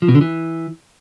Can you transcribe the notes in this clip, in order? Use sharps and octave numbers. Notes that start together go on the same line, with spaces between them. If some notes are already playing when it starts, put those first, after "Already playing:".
F3
B2
D3
E3